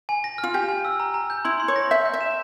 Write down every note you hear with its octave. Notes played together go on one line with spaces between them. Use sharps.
G#5
A#6
F6
F4
G4 G#5
G#5
E6
A#5
A#5
G6
E4 C6
C6
C#5
A#6
E5 G6
G6
E5
E7